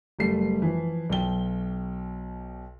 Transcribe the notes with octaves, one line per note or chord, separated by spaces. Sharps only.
F#1 G3 A3 C7
E3 F3
B1 B2 G5 G7